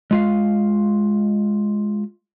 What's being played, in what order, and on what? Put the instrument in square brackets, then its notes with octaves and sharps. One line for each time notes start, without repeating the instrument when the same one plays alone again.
[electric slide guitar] G#3 F4 F5